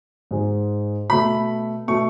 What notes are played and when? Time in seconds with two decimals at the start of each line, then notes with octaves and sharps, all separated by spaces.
0.31 G#2 G#3
1.09 B2 A3 B5
1.88 B2 A3 C#6